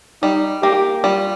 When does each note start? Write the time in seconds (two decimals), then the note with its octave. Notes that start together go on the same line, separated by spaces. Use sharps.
0.22 G3 D#4
0.63 A#3 G4
1.04 G3 F4